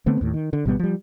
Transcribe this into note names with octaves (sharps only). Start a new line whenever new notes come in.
D3 A3 B3 C4
D#2 A2
D#3
D3
G#1 B2 G3 B3
F3 G3